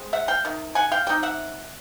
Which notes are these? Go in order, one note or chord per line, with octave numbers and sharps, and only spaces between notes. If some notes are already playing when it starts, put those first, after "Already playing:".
Already playing: G#3 C4
E5 F#5
F5 G5
C3 D#3
F#5 G#5
F5 G5
G3 C4 D#4 G5
E5 F#5